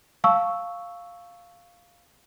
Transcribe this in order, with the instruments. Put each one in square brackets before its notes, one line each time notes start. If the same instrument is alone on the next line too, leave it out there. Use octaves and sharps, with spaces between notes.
[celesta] F5 A5 C#6 E6